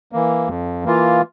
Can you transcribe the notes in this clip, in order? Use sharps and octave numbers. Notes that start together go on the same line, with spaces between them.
E3 A#3
F2
E3 A#3 F4